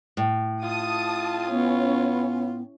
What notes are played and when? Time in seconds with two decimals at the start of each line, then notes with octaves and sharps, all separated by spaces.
0.17 A2
0.64 F4 A5 D#6
1.50 B3 C#4